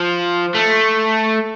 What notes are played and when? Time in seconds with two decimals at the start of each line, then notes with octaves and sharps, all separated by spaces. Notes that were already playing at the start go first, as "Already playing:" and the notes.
Already playing: F3
0.55 A3